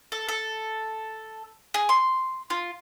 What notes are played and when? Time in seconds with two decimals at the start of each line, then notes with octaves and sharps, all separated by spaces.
0.12 A4
0.29 A4
1.74 G#4
1.89 C6
2.50 F4